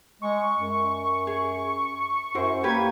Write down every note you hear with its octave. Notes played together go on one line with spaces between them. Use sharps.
G#3 C#6
F#2
G#4
F#2 E4 F#4 C5
A#3 C#4 G4 B4 G#6